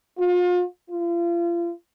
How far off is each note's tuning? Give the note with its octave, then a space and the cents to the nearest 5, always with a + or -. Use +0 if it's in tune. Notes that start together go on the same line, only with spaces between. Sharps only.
F4 +35
F4 -35